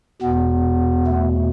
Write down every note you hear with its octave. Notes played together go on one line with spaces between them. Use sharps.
E2 B2 B3
A3